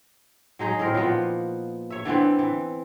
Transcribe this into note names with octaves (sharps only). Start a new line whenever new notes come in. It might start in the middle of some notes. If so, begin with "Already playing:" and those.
F#3 G#3 D#4 G#4
A2 D#3 C4 A#4
A#2 F3 B3 F#5
C#5 E5
D3 E3 B3 C4
E3